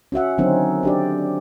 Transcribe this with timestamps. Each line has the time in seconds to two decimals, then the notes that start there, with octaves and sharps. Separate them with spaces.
0.12 C#4 F#4 E5 F#5
0.38 D3 D#3 F#3 C4 C#4 D#4
0.83 D4 G4 D5